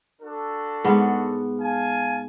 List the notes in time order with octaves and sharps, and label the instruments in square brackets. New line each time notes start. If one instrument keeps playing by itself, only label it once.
[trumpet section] D4 F#4 A4
[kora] G#2 B3
[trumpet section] F5 G#5 A5